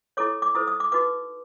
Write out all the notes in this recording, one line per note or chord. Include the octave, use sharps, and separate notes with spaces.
E4 A4 C#5 D6
D6
E4 A4 C5 D#6
D#6
D6
D#4 F#4 B4 D6